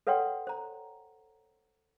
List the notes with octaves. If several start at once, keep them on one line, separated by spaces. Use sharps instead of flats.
A4 B4 C#5 F#5 G5 C6
C5 A#5